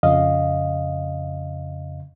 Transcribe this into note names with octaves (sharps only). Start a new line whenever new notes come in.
F2 C#3 D#5 F5